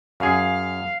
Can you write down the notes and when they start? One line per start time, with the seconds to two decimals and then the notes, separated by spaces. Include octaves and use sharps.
0.20 F#2 G#4 F5